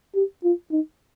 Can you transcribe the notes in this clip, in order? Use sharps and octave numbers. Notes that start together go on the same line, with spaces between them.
G4
F4
D#4